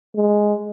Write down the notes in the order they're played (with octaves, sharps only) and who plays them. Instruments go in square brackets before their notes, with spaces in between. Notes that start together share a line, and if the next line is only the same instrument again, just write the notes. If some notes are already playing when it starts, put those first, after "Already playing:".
[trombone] G#3